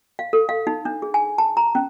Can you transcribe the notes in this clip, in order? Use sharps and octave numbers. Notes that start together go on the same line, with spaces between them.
F5
A4
F5
D#4
D4
G#4
G#5
A5
A#5
C#4